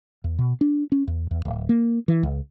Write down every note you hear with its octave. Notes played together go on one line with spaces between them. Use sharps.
E2
B2
D4
C#4
E2
E2
D1
A#3
E3
C#2